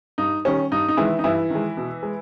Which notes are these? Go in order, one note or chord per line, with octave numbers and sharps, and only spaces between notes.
G2 D#4
D#3 G3 C#4
G2 D#4
D#4
D#3 E3 G#3 E4
D#4
G2 E3 E4
D#3 G#3
B2
G#3